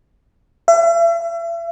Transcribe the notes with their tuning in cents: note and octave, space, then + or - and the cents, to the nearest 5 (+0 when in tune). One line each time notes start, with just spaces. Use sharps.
E5 +40